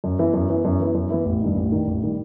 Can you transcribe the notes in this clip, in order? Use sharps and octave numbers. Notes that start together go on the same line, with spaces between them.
F#2
E3 B3 E4
F#2
E3 B3 E4
F#2
E3 B3 E4
F#2
E3 B3 E4
A1
G2 D#3 G3 D#4
A1
G2 D#3 G3 D#4
A1
D#3 G3 D#4